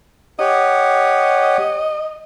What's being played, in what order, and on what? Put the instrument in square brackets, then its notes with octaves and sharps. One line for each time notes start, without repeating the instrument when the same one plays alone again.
[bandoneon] G4 C#5 F#5 [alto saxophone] D#5